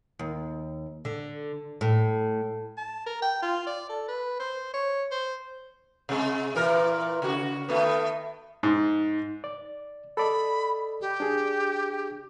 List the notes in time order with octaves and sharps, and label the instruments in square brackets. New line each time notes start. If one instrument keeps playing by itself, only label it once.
[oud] D#2
D3
A2
[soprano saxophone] A5
A#4
G5
F4
D5
A4
B4
C5
C#5
C5
[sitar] C3 G#3
A#2 E3 A#4
C#3 F#4
D#3 A3 B3
[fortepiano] G#2
[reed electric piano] D5
[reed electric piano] A4 D5 D#5 [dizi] B5
[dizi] G4
[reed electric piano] D4 G#4